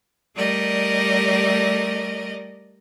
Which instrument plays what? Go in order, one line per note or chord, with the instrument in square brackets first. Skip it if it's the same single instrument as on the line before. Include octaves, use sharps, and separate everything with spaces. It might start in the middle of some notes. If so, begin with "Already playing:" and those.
[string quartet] G3 A3 A#4 D5 D#5